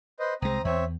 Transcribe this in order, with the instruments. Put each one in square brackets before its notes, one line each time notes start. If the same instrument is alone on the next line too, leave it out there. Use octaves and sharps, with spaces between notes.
[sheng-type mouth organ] B4 C5 D#5
[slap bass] C2 G#3 [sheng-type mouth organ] C4 A#5 D#6
[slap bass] E2 [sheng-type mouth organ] C4 C#5 E5